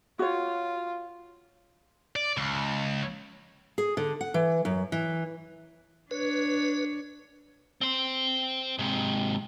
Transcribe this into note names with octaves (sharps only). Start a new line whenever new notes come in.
F4 F#4 C#5
D5
C#2
G#4
D3
F#5
E3
F#2
E3
D4 B4 C#5
C4 C5
G#2 C3